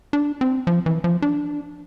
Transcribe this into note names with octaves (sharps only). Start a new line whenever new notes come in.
D4
C4
F3
E3
F3
D4